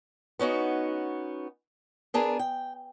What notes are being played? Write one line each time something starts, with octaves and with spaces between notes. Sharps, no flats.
B3 C#4 D#4 F#4
B3 D4 G#4 A#4
G5